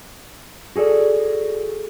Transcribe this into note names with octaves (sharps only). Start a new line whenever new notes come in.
F#4 G#4 A4 D5